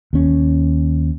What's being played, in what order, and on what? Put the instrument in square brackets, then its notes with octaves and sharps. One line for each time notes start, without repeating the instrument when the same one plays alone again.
[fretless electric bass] D#2 C#4